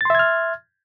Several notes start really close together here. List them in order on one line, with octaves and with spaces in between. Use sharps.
A6 C6 E5 G#6 F6